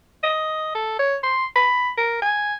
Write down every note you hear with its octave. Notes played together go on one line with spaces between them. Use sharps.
D#5
A4
C#5
C6
B5
A#4
G#5